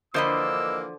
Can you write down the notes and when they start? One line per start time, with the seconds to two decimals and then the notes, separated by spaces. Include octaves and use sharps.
0.14 D3 E3 F3 A#3 C5 D#5 B5 E6